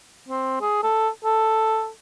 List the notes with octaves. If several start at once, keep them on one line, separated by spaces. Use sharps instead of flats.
C4
G#4
A4
A4